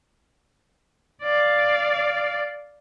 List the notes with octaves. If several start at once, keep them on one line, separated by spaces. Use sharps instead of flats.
D5 F5